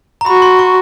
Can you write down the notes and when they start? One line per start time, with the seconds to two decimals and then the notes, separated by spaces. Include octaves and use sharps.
0.21 A#5
0.26 F#4 B5
0.42 C6
0.59 C#6